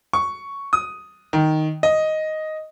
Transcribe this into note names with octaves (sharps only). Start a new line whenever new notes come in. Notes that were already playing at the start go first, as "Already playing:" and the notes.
C#6
D#6
D#3
D#5